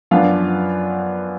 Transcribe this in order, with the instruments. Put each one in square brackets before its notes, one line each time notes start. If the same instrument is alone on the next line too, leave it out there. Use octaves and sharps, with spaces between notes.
[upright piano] F#2 F3 B3 D4 F4 F5